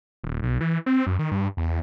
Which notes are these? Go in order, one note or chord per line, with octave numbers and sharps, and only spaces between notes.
D#1
B1
E3
C4
F#2
D#3
G2
E2